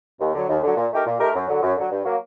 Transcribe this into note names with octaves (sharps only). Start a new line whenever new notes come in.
D#2
D3 F#3
D#2
D3 F#3
A#2
A3 D#4 G4 A#4
A#2
A3 D#4 G4 A#4
F#2
D3 F#3
F#2
D3 F#3
G2
F#3 A#3